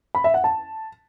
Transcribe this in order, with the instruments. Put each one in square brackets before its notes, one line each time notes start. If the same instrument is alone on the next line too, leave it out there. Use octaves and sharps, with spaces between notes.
[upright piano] B5
E5
F#5
A5